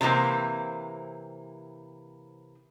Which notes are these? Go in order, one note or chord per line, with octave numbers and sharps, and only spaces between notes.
C3 E3 F3 A#3 C4